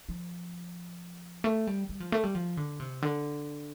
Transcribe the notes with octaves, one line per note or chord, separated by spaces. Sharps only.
F3
A3
G3
G3
F3
A3
G3
F3
D3
C3
D3